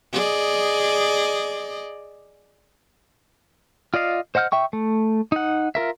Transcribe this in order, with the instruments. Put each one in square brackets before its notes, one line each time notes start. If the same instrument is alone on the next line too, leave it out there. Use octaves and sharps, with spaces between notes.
[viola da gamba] G#4 D5 D#5
[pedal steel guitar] F4 D5 D#5 F5
C5 D#5 F#5 F6 G6
E5 G5 C#6
A3
D#4 F#5
F4 A#4 E5